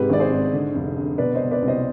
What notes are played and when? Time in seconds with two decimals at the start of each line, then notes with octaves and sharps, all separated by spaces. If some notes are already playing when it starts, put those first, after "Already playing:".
Already playing: G#2 C3 G4 B4
0.09 G#1 D5
0.20 G#4 C5
0.31 G#2
0.53 D3
0.74 F1
0.97 D3
1.18 B2 B4 D5
1.35 C5 D#5
1.41 B2
1.51 B4 D5
1.62 C2
1.68 C5 D#5